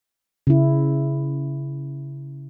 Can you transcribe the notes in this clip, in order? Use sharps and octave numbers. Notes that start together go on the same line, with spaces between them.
C#3 E4